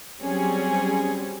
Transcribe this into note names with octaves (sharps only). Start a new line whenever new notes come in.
F#3 G3 C4 C#4 G#4